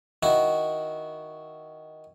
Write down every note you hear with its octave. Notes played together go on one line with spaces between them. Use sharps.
D#3 E4 F#4